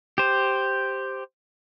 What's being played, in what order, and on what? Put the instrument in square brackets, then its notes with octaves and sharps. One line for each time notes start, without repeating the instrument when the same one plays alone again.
[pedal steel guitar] G4 C5